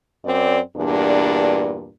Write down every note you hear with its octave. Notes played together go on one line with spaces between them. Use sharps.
F#2 C4 D5
E2 G2 A#2 D4